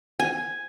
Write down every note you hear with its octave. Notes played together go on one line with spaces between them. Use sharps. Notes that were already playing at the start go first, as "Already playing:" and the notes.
G#5